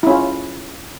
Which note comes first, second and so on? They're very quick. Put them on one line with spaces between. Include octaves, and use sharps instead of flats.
E4 C#4 F4